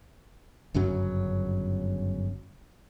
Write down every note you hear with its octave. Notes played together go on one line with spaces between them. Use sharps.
G1 F#2 C#3 F#3